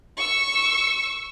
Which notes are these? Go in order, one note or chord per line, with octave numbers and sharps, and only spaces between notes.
C#6 E6